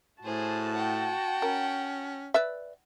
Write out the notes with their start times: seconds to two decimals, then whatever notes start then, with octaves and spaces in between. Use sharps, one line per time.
0.23 A2 F#4 G#4 C5 A5
0.74 F#5 G5
1.42 C#4 A#4
2.34 B4 D5 E5